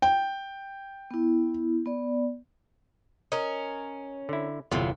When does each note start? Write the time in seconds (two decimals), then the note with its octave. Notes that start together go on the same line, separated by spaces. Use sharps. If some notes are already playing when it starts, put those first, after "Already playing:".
0.02 G5
1.11 B3 E4
1.86 B3 D5
3.32 C#4 A#4 D#5
4.29 D3 E4
4.72 G1 E2 C3 E3 F#3 F4